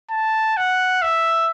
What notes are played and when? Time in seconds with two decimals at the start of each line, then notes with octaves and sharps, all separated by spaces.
0.10 A5
0.57 F#5
1.02 E5